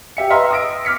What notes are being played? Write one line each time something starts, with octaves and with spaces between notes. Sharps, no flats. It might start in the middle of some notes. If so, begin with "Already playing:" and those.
G4 E5 C#7
B4 D#5 E5 A#5 C6 F6
D#6 E6 A#6 D7
D6 F6 B6 C#7